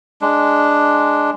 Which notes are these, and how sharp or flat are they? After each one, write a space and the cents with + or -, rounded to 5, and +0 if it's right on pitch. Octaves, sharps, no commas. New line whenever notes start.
G#3 +0 D4 +0